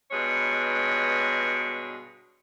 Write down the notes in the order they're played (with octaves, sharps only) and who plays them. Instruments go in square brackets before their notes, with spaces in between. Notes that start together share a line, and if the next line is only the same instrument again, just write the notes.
[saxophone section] G2 B2 G#3 C#5